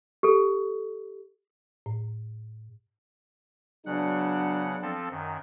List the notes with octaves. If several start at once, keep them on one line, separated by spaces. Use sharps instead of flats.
G4 A4
A2
C#3 F#3 B3 D4 F#5
F3 C4 A4
F#2 D#3